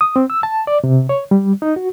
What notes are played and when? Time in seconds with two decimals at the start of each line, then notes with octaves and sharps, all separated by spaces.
0.01 D#6
0.16 C4
0.30 E6
0.43 A5
0.67 D5
0.84 C3
1.09 C#5
1.31 G3
1.62 D#4
1.76 F#4